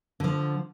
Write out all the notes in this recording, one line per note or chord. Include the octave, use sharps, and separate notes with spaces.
D3 F3